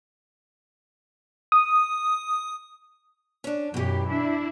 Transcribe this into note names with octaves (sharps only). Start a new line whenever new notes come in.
D#6
C#4 D4
F#2 B2 E3 G4
D4 E4